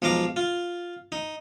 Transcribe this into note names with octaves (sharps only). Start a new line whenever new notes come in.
B1 F3 G#3 F5 A#5 D6
F4
D#4